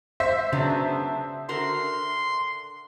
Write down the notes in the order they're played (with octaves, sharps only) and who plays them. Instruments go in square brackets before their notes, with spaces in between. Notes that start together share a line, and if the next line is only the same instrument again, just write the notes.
[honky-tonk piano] C5 E5 B6
[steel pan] C#3 [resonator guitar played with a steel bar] F#3 B3 D4
[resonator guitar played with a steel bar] D3 F#4 A#4 [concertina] C6